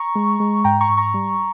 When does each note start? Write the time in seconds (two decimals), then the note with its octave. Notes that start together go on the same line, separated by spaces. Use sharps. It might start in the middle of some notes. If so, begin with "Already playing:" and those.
Already playing: A#5 C#6
0.15 G#3
0.40 G#3
0.64 G#2 G5 A#5
0.81 A#5 C#6
0.89 G#2
0.97 A#5 C#6
1.14 G3